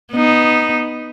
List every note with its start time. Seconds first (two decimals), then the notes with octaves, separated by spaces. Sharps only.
0.13 B3 D#4